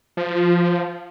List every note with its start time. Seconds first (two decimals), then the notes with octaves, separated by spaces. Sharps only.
0.17 F3